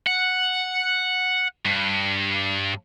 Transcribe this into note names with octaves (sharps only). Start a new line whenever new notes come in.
F#5
G2